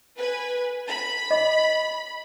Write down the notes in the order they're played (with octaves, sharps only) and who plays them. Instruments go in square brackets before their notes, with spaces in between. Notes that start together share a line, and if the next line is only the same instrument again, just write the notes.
[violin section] B4 G#5
B5
[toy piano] D#5